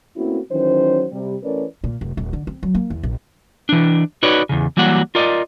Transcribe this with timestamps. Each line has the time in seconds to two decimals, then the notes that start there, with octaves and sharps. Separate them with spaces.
0.16 A3 A#3 C4 C#4 E4 F#4
0.51 D#3 E3 F#3 C#4 C5
1.12 C3 G3
1.43 E3 A3 C#4 A#4 B4 D5
1.84 A#2
2.01 F1
2.17 D#1
2.33 D3
2.47 C4
2.63 F#3
2.75 A#3
2.90 E2
3.03 A#1
3.69 E3 D4
4.23 D#4 F#4 B4 C#5 D5
4.49 E2 C#3
4.77 E3 F#3 G3 A#3 F#5
5.15 F4 A#4 D5 D#5